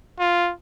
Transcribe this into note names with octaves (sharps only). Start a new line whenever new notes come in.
F4